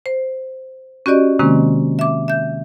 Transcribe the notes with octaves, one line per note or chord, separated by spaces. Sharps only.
C5
C#4 F#4 G4 D5 D#5
C3 D#3 G#3 A#3 C4 C#4
E5 D6
E5 G6